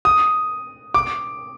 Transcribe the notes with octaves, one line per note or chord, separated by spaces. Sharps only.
D#6
D6